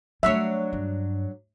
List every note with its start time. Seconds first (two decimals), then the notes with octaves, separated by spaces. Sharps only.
0.23 F#3 G3 A3 D4 C#5 E5
0.73 G2